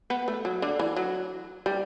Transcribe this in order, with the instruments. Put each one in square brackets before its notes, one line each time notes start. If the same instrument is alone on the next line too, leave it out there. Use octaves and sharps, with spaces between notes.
[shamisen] B3
A3
F#3
D3
E3
F#3
G3